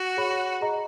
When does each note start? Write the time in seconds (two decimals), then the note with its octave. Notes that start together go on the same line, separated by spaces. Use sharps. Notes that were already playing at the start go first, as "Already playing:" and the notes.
Already playing: F#4
0.17 G#4 C#5 F#5 B5
0.61 G#4 D#5 A#5